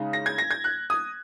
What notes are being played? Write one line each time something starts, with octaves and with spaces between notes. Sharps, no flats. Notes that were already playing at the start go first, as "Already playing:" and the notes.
Already playing: C#3 G#3 D#4
A#6
G#6
A#6
G#6
F#6
D#6